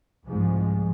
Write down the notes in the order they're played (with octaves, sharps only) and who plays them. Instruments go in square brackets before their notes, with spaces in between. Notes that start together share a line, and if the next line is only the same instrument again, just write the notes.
[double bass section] C2 G#2 F3 G#3